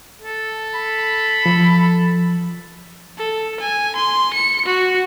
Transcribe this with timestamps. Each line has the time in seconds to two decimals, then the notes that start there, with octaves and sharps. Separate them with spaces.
0.22 A4
0.75 B5
1.46 F3
3.18 A4
3.60 G#5
3.96 C6
4.34 C#7
4.66 F#4